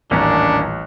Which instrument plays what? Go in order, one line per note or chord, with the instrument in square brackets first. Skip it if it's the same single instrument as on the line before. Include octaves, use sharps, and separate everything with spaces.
[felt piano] D#1 A#5 F#6 [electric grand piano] A1 [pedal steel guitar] A#3 C#4 C#5 [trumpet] D4